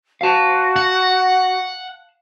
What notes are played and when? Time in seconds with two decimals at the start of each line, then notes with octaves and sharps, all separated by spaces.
0.21 F#4 F5 A5
0.76 F#5